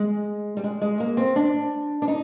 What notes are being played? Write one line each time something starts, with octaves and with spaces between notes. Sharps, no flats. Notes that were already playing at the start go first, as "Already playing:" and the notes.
Already playing: G#3
G3
G#3
G#3
A#3
C4
D4
D4
D#4